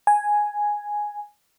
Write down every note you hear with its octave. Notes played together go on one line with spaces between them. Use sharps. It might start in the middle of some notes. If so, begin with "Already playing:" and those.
G#5